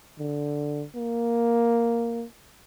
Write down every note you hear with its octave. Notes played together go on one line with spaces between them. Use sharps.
D3
A#3